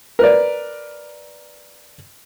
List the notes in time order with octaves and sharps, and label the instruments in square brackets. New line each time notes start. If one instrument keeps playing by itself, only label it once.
[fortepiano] A#4 B4 D5